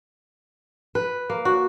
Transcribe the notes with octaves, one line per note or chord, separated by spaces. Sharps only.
B4
A#3
F#4